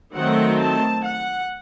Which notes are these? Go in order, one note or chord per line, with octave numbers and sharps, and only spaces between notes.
D#3 F#3 A3 C4 F#5
A5
F#5